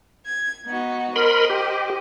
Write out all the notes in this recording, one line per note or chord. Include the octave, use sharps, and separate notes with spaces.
G#6
B3 D#4 F#4
A#4 C5 D#5 B5 C6
G4